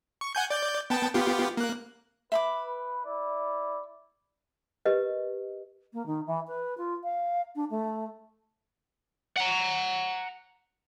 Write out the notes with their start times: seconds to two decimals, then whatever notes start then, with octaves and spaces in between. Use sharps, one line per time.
0.21 C#6
0.35 F#5 G#5 G6
0.50 D5 G6
0.90 B3 G5 A5
1.14 B3 F4 G4
1.57 A#3 F#6
2.32 B4 E5 B5 D6
3.06 E4 D5
4.86 G4 A#4 B4 D#5
5.94 A#3
6.06 D#3
6.27 E3
6.48 B4
6.78 F4
7.04 F5
7.55 D4
7.70 A3
9.37 F#5 A#5